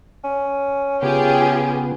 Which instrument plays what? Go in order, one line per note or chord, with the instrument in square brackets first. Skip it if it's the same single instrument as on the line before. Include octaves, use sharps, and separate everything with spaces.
[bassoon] C#4
[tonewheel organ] C#3 B3 [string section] F4 G4 G#4